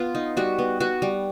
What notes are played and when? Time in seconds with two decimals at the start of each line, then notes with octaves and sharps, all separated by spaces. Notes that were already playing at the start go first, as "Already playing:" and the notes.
Already playing: B3 F4
0.15 D#4
0.37 G3 F#4
0.58 B3
0.80 B3 F#4
1.02 G3